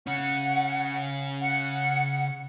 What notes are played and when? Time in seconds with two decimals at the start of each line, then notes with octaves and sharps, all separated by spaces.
0.07 C#3 C#4 F#5
1.41 F#5